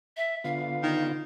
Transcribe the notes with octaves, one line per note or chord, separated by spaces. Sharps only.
E5
D3 B3 F4 F5
D#3